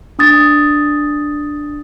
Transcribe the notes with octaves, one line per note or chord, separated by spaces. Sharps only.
D4 D#6 A6